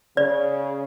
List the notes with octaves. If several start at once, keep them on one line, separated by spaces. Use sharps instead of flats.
C#3 D5